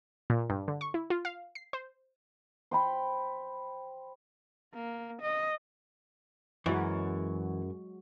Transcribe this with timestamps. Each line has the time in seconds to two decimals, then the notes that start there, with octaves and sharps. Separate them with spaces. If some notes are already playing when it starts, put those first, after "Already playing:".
0.30 A#2
0.50 G2
0.68 D3
0.81 C#6
0.94 E4
1.10 F4
1.25 F5
1.55 C7
1.73 C5
2.71 C5 G5 B5
4.74 A#3
5.22 D#5
6.66 F#2 E3 F#3 G#3 F#4